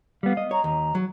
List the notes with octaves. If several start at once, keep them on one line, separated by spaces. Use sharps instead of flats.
G3 B3 F5
D#5
C#5 A#5
D#2 A#5
F#3